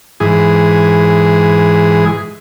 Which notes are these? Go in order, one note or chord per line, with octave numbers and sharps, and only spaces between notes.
G#2 E3 G#4